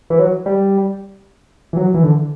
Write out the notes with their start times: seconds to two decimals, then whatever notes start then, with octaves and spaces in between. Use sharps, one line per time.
0.10 E3
0.19 F#3
0.46 G3
1.73 E3
1.77 F#3
1.94 E3
2.03 D3